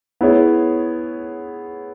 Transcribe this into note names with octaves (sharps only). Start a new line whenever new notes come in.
B3 E4 G#4 C#5